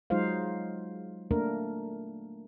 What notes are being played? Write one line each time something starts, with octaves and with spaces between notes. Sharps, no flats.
F#3 G#3 D#4 F4 C5 F5
A3 A#3 D4 A#4